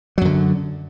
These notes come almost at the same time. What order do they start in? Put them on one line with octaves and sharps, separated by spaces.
F#3 F#2 D3